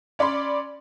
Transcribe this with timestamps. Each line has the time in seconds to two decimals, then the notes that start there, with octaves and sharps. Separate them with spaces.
0.19 C#4 D5 B5 C6